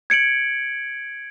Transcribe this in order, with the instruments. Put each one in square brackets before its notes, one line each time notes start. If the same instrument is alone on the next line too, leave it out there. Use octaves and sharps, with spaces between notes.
[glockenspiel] G#6 C#7 D7 F#7